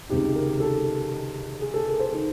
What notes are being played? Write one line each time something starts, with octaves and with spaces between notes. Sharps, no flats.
C#2 C3 D#3 G4
A#4
A4
G#4
A4
A#4
C5
D#3